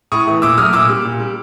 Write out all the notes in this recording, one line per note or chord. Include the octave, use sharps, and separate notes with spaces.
A2 C#6 D#6
E3 A3
A#2 D6 E6
F#3 D#6 F6
A3
A#2 D6 E6
G3
A#2
G3